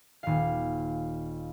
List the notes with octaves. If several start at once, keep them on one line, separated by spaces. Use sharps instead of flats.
D#1 F5